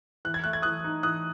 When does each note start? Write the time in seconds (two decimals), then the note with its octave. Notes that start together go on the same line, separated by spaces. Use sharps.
0.25 E3 F#6
0.34 G#6
0.44 A3 F#6
0.53 G#6
0.62 E3 D#6 F#6
0.84 D#4
1.03 E3 D#6 F#6